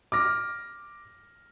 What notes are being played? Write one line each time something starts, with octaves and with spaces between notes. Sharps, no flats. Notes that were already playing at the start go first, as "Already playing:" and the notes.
D6 F6 A#6